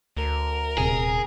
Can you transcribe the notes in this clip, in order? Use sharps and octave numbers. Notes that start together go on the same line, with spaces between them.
D2 A#4
D#1 C3 G#4